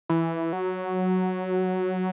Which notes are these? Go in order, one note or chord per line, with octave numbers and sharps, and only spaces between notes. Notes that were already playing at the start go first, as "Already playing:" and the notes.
E3
F#3